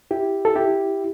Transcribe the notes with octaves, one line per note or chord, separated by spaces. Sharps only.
E4 G4
A4
E4 G4